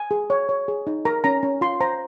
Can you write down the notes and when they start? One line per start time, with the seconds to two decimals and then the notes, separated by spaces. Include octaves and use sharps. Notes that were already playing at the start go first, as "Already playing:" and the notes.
Already playing: G#5
0.11 G#4
0.30 C#5
0.49 C#5
0.68 G#4
0.87 D#4
1.05 A#4 A#5
1.24 C#4 A#5
1.43 C#4
1.61 F4 C6
1.80 C5 A#5